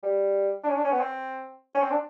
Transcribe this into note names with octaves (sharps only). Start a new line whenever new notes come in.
G3
D4
C#4
D4
C#4
B3
C4
C#4
C4
D4